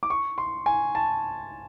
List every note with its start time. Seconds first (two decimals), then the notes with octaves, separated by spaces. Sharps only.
0.03 D6
0.10 C#6
0.38 C6
0.66 G#5
0.95 A5